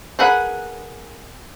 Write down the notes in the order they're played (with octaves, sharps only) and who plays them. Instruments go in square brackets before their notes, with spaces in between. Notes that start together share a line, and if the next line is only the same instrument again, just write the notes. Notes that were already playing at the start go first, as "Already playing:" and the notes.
[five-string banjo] G#4 A#4 B4 F#5 B5